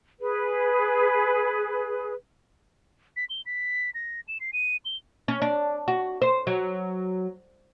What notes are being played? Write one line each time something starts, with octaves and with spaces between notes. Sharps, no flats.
G#4 B4
B6
G7
B6
A#6
E7
C7
D#7
G7
C#4
D4
F#4
C5
F#3